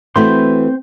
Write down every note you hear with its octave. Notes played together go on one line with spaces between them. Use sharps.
E3 A3 C4 F#4 C5 C6